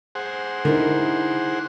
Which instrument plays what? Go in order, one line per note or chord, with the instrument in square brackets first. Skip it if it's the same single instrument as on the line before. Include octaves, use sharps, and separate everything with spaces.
[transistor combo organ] G#4 C5 F#5
[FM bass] D3 [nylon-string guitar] D#4 E4 A#4